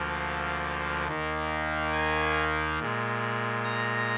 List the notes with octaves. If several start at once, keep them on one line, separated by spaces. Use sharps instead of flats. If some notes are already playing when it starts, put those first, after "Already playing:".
Already playing: D2 D3 F3 A#3
D#2 D#3 A#3
G#5
A#2 G#3
A#5